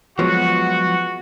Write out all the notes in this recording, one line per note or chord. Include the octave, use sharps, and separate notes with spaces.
F3 F#3 G#3 B3 F#4